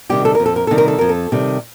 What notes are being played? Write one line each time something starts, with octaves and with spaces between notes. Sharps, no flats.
C3 D#3 G3 G4
A4
F2 A#4
A4
A#4
C3 D#3 G3 A4
A#4
A4
F2 A#4
A4
C3 D#3 G3